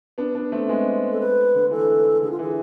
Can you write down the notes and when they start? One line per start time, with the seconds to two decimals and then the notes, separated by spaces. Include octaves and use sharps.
0.18 B3 D4
0.35 B3 D4
0.52 A3 C4
0.69 G#3 B3
1.11 A4
1.20 B4
1.54 D3
1.71 E3 A4
2.22 D3 G#4
2.30 F4
2.39 E3 G#4